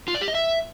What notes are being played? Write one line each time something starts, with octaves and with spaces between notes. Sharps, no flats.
F4
D5
G4
D#5
E5